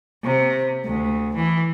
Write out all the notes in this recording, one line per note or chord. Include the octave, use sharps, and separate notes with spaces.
C3
D2
E3